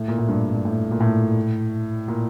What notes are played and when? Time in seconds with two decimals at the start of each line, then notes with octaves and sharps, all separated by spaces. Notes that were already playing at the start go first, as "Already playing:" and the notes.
Already playing: A2
0.08 A#2
0.18 A2
0.28 G2
0.54 G2
0.65 A2
0.91 A#2
1.00 A2
2.08 A#2